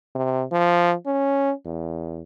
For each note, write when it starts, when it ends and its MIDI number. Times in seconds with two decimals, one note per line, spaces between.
0.15 0.44 48
0.52 0.94 53
1.06 1.52 61
1.65 2.23 40